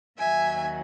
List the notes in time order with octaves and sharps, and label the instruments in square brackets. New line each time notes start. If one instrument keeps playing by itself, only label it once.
[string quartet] D#2 D#3 F#3 E5 G#5